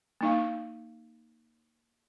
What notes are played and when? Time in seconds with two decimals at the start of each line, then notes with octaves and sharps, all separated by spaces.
0.21 A#3 D#4 F5